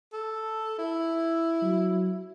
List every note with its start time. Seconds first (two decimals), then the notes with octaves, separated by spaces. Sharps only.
0.13 A4
0.79 E4
1.62 F#3